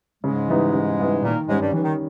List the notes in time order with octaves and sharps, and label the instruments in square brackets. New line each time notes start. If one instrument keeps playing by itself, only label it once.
[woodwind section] G#2 G#3 [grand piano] C#3
[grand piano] E3 G3 B3 D#4
C#3
E3 G3 B3 D#4
[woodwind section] A#2 A#3 [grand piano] D#3
[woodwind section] G#2 G#3 [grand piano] G3 C#4
[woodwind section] G2 G3
[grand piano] D#3 [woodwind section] E3
[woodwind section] D#3